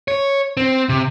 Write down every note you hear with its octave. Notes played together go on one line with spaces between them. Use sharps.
C#5
C4
C3